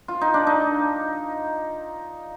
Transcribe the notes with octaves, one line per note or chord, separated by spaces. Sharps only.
F4
D#4
D4
D#4